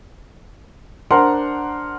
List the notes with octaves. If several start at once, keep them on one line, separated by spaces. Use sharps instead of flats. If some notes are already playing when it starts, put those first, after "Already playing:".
D4 A#4 C5 F#5 A#5 C6